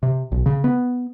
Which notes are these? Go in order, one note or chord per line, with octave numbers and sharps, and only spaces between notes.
C3
B1
C#3
B3